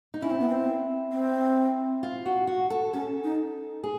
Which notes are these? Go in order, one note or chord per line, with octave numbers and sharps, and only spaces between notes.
D#4
C#4 E4
C4
B3
C4
C4
F4
F#4
F#4
A4
C#4 A4
D#4
G#4